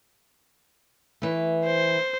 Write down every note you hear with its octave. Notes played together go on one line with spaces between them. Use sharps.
E3 A3
C5